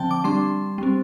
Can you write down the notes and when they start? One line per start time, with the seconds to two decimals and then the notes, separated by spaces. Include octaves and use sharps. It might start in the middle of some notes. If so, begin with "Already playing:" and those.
Already playing: D3 F3 C4 G5 A5
0.11 D6
0.24 G3 D4 C6
0.78 G3 C4